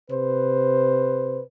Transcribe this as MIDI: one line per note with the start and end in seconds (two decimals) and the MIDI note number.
0.11 1.42 48
0.11 1.42 71
0.11 1.42 72